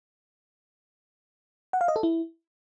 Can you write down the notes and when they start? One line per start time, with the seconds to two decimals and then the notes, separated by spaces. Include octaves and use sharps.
1.73 F#5
1.81 F5
1.88 D#5
1.96 A4
2.03 E4